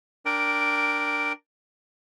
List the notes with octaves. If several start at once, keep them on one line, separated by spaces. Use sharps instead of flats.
D4 A#4 G5